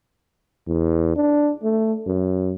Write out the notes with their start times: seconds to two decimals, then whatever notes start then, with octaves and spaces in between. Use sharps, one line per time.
0.67 E2
1.16 D4
1.63 A3
2.07 F#2